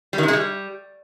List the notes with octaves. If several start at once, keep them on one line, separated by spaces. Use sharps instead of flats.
G3
D#3
C3
G#3
G3